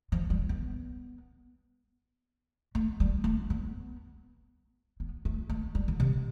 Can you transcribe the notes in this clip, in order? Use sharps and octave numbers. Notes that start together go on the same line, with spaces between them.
F3
G3
B3
A3
G3
A3
B3
B3
A3
A3
G3
D3
C3